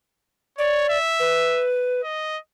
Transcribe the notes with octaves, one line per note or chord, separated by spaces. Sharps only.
C#5 D5
E5
B4
D#5